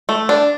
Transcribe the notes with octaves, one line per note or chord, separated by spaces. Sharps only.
A3
D4